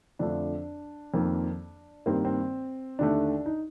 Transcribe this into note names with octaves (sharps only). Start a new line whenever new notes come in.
F2 D3 F3 A3 D4
F2 D#3 A#3
G2 D#3 A#3 C4
C4
D#2 D3 A3 D4
D#4